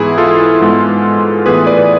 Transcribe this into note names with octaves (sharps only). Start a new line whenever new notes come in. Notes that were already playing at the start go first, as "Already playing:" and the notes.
Already playing: G#2 E3 B3 E4 G#4
F4 A4
G#2 G#3 B3
A2 E3 B3 G#4 B4
B4 D5